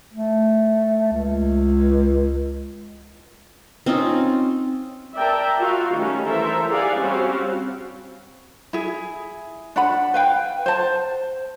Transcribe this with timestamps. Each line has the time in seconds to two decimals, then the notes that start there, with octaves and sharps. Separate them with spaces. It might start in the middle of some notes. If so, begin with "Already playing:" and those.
0.13 A3
1.12 C#2
3.86 C4 C#4 D#4 F4
5.15 A#4 D5 E5 G5 A5
5.58 F4 F#4 F5
5.96 D#3 G3 A3 C#4
6.28 E3 A4 A#4 C5 E5
6.69 G4 G#4 D5 F5 F#5 G#5
6.99 G3 C4 C#4 F4 F#4 F5
8.73 E4 G#4
9.76 D4 F#5 B5
10.14 B4 F5 G5
10.66 C5 A5